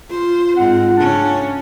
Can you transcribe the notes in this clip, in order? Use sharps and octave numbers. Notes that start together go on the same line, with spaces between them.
F4 C5
G#2 C4 F#5
C#3 C#4 D4